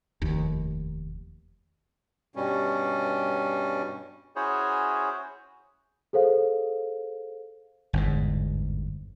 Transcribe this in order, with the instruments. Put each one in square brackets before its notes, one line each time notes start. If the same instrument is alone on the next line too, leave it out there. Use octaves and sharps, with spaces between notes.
[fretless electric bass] F1 D#2
[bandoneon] G2 B2 G3 C#4
[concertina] C#4 E4 F#4 G#4 C5 C#5
[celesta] G#4 A4 C5 F5
[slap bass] G1 E2 G#2